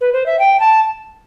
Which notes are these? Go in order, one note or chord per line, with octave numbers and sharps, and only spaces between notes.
B4
C5
E5
G5
A5